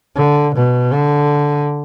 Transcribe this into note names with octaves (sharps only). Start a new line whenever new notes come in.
D3
B2
D3